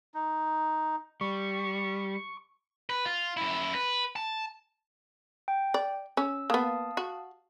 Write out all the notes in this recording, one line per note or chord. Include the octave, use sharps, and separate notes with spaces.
D#4
G3 C#6
B4
F4
F#2 E4
B4
A5
G5
D5
C#4 E6
A#3 B3 F5 A5 D#6
F#4